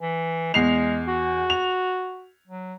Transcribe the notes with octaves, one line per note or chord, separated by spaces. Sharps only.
E3
E2 G#3 C7 F7
F#4
F7
F#3